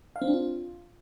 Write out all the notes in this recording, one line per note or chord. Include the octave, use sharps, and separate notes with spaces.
F5
C4
D4
F4